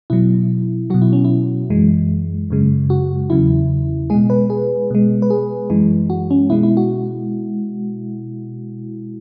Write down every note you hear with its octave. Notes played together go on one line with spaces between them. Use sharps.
B2 F#3 E4
B2 F#3 F#4
E4
C#4
E4
F#2 E3 G#3
F#2 C#3 G#3
F#4
E2 C#3 F#3 E4
B2 G#3 G#4
B4
G#4
B2 G#3
B4
G#4
F#2 E3 G#3
F#4
C#4
B2 G#3 E4
E4
F#4